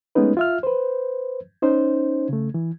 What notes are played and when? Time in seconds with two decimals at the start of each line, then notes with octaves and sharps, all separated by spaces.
0.15 G#3 A3 B3 C#4 D#4 B4
0.37 F4 E5 F6
0.63 B4 C5
1.62 C#4 D#4 C5
2.29 C#3 A3
2.54 E3